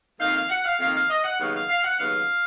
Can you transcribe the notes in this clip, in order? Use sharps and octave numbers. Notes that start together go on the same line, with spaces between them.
F2 D#3 A#3 D#4 F5
F5
F#5
F5
F2 D#3 A#3 D#4 F5
F5
D#5
F#5
D#2 C#3 F#3 B3 D#4 F5
F5
F5
F#5
D#2 C#3 F#3 B3 D#4 F5